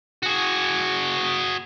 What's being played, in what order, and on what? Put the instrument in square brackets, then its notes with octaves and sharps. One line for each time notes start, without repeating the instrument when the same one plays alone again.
[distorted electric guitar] F#4 G#4